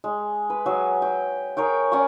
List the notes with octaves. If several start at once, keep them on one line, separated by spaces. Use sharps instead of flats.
G#3
B4
F#3 G#4
G5
G#4 A#4 C#5 G5
C#4 D5 F#5 C#6